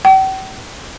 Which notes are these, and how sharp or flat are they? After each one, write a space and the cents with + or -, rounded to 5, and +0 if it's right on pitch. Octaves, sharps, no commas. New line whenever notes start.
G5 -45